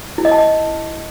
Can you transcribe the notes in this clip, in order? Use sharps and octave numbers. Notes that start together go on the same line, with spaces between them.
E4
D#5
A5
D#5